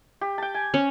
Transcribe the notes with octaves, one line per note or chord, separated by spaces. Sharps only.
G4
G5 A5
G#5
C#4